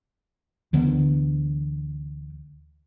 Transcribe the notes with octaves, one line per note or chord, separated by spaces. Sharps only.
D2 D3 E3 B3